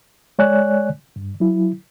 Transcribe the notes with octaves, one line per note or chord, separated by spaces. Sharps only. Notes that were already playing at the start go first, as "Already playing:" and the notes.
G#3 C#5 D5 G#5 F#6
G2
F#3 E4